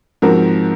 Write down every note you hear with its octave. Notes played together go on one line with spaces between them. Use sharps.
G#2 F3 C4 F#4 A#4